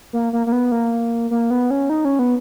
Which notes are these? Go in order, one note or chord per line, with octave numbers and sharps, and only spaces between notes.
A#3
A#3
A#3
B3
A#3
A#3
B3
C#4
D#4
C#4
B3